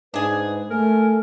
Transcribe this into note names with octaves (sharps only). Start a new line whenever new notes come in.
G#2 D4 G#4 B4
A3 A#4 G#5